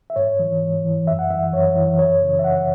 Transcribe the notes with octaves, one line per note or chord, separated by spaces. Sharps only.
E5
G#2 C#5
E3
G#2
E3
F#2 E5
F#5
E3 E5
F#2 C#5
E3
F#2 C#5
C#3 E3
E5
F#2 F#5